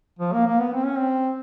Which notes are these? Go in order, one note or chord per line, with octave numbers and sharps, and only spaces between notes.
F3
A#3
A#3
B3
C4
C#4
C4